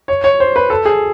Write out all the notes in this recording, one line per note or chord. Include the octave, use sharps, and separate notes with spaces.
C#5
C#5
C5
B4
A4
G#4